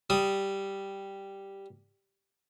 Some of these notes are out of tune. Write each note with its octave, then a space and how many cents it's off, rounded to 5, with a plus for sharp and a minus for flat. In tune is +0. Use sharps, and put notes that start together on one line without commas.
G3 +0 D#6 +0